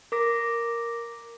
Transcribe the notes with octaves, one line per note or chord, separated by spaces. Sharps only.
A#4 D6 A#6